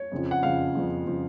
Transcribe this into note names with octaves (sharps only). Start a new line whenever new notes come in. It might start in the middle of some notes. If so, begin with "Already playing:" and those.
Already playing: C#5
F2 C#3 F3
F#5
F2 C#3 F3 F5
F2 C#3 F3
C#3 F3